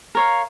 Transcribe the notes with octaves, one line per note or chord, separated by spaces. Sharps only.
A#4 C#5 F5